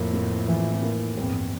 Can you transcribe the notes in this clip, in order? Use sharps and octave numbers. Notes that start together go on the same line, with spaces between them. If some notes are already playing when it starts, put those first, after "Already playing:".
Already playing: F2 A2 A#3
A#3
E3
A#3
E2 G2 C4